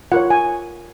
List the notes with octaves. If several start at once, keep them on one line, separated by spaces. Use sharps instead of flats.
F4 A#4 C#5 F#5
G#5